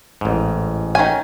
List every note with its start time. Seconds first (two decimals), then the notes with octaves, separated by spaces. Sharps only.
0.21 A1 G#2
0.95 D#3 C#4 G#5